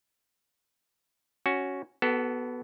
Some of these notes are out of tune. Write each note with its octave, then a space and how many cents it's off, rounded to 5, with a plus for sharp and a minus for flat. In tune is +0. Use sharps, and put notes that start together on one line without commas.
C#4 +0 F#4 +0
B3 +0 F#4 +40 A4 +0